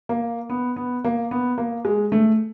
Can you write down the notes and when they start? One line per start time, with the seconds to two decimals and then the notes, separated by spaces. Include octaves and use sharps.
0.09 A#3
0.50 B3
0.76 B3
1.04 A#3
1.31 B3
1.58 A#3
1.85 G#3
2.12 A3